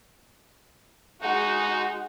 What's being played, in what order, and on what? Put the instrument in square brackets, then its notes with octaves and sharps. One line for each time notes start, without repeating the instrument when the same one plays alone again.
[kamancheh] G#3 F#5 [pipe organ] D#4 F#4